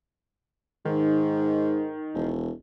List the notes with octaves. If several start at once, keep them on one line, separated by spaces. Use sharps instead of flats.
G#2 D#3
E1